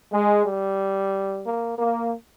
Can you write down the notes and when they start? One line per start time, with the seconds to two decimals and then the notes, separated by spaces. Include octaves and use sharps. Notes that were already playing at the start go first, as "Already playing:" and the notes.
0.12 G#3
0.45 G3
1.45 A#3
1.78 A#3